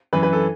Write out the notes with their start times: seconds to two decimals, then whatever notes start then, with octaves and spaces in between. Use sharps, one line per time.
0.13 F#2 E3 B4
0.23 B4
0.33 A4